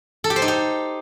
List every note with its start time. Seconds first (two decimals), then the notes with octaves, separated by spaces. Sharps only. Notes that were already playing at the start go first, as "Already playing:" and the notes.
0.24 A4
0.30 G4
0.36 C5
0.42 D#4
0.48 G4